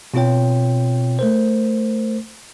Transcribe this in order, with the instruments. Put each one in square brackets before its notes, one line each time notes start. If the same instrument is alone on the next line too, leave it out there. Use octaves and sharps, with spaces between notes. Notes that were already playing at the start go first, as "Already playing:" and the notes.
[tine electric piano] B2 C4 F4 C#5 G5
A3 A#4 C5